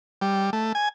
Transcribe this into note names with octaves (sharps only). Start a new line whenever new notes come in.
G3
A3
G#5